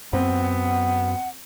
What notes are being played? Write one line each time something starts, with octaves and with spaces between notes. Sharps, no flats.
F#2 B3 C4
F#5